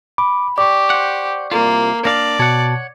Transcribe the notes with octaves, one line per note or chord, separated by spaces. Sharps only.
B5 D6
G4 D5 C#6 D6
C5 F#5
C2 A#3 F4
A#3 D4 D5 F5 A#6
B2 C#5 F#5 A5